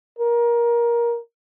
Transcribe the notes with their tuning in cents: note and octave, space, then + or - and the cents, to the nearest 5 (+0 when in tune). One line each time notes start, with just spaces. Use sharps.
A#4 +20